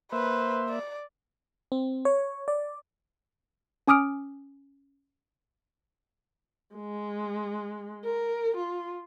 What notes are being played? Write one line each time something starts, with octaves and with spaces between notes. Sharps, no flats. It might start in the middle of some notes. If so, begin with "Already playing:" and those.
A#3 B4 C5 E5
D5
C4
C#5
D5
C#4 G#5 D6 D#6 F6 D7
G#3
A#4
F4